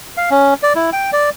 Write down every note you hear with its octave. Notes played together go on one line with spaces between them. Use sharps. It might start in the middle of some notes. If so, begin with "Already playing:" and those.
F5
C#4
D5
E4
G5
D5